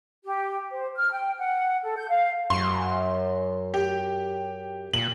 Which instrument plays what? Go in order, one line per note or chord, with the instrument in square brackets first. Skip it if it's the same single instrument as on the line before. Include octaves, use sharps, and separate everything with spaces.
[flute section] G4
C5
F6
G5
F#5
A4
G6
F5
[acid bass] F#2 [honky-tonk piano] C6
[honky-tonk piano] G4
[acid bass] A#2 [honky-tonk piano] F#7